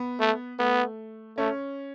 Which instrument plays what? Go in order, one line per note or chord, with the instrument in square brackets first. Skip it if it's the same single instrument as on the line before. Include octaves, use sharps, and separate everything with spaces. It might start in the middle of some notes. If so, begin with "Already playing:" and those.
Already playing: [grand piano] B3
[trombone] A3
[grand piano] A3 [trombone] B3
[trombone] A3 [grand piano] C#4